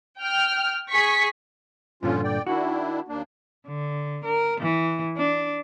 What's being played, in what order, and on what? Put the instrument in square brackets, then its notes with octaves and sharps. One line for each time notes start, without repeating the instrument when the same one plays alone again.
[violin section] G5 F6
G#4 C#6 B6
[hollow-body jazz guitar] G2 A#2 D3 [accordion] F3 C#4 F4
[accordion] D5 G5
[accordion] D#3 D4 E4 [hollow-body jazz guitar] F#4
[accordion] D#2 A#3 D4
[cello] D3
A#4
E3
D4